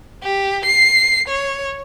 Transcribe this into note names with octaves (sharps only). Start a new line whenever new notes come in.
G4
C7
C#5